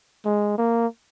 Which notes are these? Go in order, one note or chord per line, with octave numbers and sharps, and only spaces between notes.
G#3
A#3